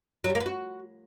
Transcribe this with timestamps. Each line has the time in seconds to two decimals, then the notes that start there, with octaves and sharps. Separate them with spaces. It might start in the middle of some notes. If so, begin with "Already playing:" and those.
0.24 F#3
0.30 G3
0.35 A#3
0.40 B3
0.46 F#4